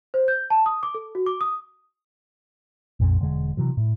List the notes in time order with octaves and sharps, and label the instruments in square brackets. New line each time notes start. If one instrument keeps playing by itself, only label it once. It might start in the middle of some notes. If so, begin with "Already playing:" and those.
[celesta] C5
G6
A5
D#6
D6
A4
F#4
D6
D#6
[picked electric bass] A#1 F2 G#3 C4
E1 D3 G#3
C3 E3 F#3
A2